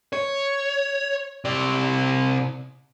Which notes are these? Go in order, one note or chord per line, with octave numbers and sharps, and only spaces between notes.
C#5
C3 D5